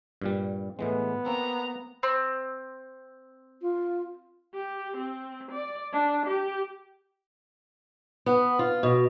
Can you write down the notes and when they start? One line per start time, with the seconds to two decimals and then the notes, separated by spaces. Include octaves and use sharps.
0.22 G2 A#2 G3
0.79 A2 E3 G#3 B3
1.26 A#3 C4 A#5
2.03 C4
3.62 F4
4.54 G4
4.97 C4
5.52 D5
5.93 D4
6.26 G4
8.26 B3
8.59 F4
8.83 B2